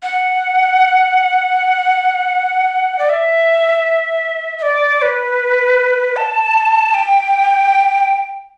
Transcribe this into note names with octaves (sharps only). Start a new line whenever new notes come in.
F#5
D5
E5
E5
D5
B4
A5
G5